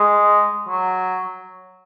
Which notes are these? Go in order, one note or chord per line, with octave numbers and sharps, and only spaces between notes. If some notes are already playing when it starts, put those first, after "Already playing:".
Already playing: G#3
F#3